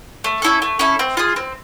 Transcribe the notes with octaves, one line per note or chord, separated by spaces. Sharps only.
A3
C#4 E4 A4
A3
C#4 E4 A4
C4
F4 G#4
C4